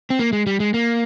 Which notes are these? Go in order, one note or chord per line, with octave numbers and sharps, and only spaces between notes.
C4
A#3
G#3
G3
G#3
A#3